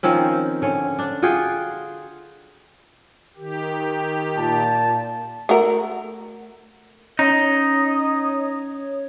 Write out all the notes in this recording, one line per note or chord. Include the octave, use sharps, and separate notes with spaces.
D#3 F3 C4 C#4
D3 C#4
D4
F4 F#4 G#4 G5
D#3 G4
A#2 A5
A3 F#4 A#4
C#4 D#4 C#5 D#5